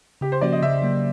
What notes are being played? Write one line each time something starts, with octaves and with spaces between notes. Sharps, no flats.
C#3 G4
C5
F3 A#3 C#4 F#4 D5
D#5
C#3 E5
F#3 A#3